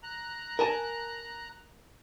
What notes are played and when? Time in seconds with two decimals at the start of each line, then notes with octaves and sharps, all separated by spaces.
0.03 A#5 F#6
0.59 A#4 G#5 A5